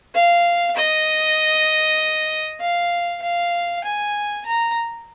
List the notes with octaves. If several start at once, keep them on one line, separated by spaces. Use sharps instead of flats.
F5
D#5
F5
F5
G#5
A#5